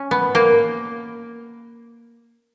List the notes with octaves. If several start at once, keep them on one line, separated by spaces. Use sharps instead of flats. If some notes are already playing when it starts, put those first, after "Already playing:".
Already playing: C#4
B3
A#3